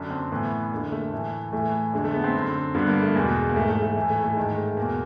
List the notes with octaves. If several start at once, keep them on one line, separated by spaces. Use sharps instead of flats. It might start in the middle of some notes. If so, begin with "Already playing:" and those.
Already playing: F#2 D3 D4
C4
A2 E3 B3
F2 D3 A#3
A3
A2 E3
A2 E3 A3
F2 D3 G#3
A3
B3
C4
F#2 D3
G2 D3 B3
A#3
A3
E2 B2 G#3
A#3
G#2 E3 A3
A3
A3
A2 E3
A3
A3
G#2 D#3 G#3
A3
E2 B2 A#3